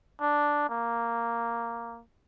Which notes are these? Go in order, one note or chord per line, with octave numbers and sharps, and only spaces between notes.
D4
A#3